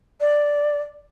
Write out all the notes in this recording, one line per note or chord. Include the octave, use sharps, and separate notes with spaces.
D5